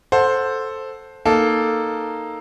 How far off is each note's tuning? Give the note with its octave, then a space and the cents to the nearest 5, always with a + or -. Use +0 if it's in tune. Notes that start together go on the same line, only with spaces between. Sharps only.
A4 +0 C5 +5 F#5 -10
A#3 +0 D#4 +0 A4 +0